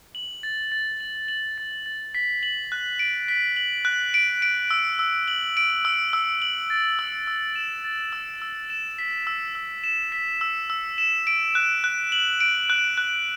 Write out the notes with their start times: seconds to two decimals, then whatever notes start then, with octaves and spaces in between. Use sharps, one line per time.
0.15 F#7
0.43 A6
0.72 A6
1.00 F#7
1.28 F#7
1.58 A6
1.86 A6
2.15 B6
2.43 F#7
2.72 F#6
2.99 D7
3.28 B6
3.57 F#7
3.85 F#6
4.14 D7
4.42 D7
4.71 E6
4.99 E6
5.28 F#7
5.57 D7
5.85 E6
6.13 E6
6.42 F#7
6.70 A6
6.99 E6
7.27 E6
7.56 E7
7.84 A6
8.13 E6
8.42 E6
8.70 E7
8.99 B6
9.27 E6
9.55 E6
9.84 E7
10.12 B6
10.41 E6
10.70 E6
10.98 E7
11.27 D7
11.55 F#6
11.84 F#6
12.12 F#7
12.40 D7
12.70 F#6
12.98 F#6